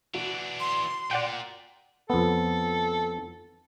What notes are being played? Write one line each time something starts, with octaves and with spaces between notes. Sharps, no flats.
E3 D4 F#4
C6
A#2 D5 F#5 G5
F2 B3 A4